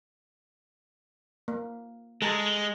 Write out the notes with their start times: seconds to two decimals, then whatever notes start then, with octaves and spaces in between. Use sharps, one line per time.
1.48 A#3
2.22 G#3 G#4 A4 A5 A#5